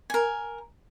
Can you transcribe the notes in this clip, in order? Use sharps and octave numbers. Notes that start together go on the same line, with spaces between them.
A#4 G#5